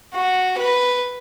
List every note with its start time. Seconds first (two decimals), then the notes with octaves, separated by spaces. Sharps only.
0.14 F#4
0.59 B4